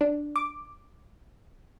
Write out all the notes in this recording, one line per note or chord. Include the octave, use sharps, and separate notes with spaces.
D4
D6